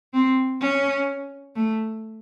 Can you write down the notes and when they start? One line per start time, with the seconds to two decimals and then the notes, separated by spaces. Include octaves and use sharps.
0.14 C4
0.61 C#4
1.56 A3